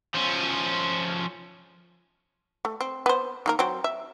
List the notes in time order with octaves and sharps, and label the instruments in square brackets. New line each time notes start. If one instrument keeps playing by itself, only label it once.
[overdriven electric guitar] F3 C#4
[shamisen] A3
C4
B3 C5
D#3 A#3 A#4
F#3 C4
E5